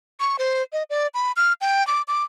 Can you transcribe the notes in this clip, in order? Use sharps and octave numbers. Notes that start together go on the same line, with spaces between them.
C#6
C5
D#5
D5
B5
F6
G5
D6
D6